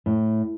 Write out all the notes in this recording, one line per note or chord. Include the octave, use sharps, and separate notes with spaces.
A2